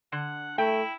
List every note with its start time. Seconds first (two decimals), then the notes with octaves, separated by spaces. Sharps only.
0.12 D3 F#5
0.58 A3 E4 G5